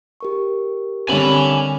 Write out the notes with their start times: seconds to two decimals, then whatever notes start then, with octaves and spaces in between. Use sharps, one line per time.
0.20 G4 A#4 C#6
1.08 D3 G3 C4 C#4 G#5 B5